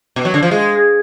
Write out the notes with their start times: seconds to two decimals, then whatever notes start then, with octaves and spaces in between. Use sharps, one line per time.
0.16 B2
0.25 F#3
0.34 D3
0.43 F3
0.51 G#3